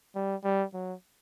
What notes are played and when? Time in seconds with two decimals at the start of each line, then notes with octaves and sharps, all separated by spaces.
0.15 G3
0.44 G3
0.74 F#3